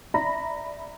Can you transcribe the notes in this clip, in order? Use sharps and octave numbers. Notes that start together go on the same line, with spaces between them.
D5 E5 A#5 B5 A#6